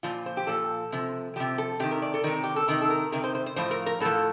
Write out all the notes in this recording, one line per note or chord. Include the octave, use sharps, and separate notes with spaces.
A#2 F3 F4
C5
G4
A#2 F3 A4
C3 F3
C3 F3 G4
A4
C3 D#3 G4
A#4
D5
A4
C3 D#3 A#4
G4
A4
C3 D#3 A#4
A4
A#4
C3 D#3 A#4
C5
C5
C5
A2 F3 C5
A#4
A#4
A2 F3 A4